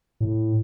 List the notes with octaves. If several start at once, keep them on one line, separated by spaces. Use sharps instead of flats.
A2